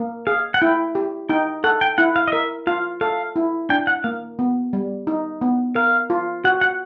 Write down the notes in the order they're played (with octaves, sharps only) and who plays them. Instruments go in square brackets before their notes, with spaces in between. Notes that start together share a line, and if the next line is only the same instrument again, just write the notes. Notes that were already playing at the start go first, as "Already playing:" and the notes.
Already playing: [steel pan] A#3
[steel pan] G#4 [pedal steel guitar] F5
[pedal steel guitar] F#5
[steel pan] E4 [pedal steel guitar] G5
[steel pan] G4
[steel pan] D#4 [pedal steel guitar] G5
[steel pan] A4 [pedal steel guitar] F#5
[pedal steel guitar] G5
[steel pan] E4 [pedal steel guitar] F#5
[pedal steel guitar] F5
D#5
[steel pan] A#4 [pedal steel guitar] E5
[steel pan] F4 [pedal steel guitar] F5
[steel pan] A4 [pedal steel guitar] F5
[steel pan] E4
[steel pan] D4 [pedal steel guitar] G5
[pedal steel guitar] F#5
[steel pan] A#3 [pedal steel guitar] F5
[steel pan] B3
G3
D#4
B3
[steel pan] A#4 [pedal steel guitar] F5
[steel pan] F4
[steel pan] F#4 [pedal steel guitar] F#5
[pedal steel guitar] F#5